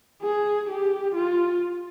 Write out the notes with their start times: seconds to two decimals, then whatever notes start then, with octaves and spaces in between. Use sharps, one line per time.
0.23 G#4
0.69 G4
1.15 F4